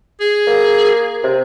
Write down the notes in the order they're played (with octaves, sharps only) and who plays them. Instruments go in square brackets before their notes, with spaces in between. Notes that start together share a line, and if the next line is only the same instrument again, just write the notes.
[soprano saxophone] G#4
[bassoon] A#3
C3